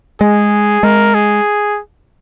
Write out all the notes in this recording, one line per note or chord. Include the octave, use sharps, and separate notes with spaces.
G#3 G#4
G#3 A#4
G#4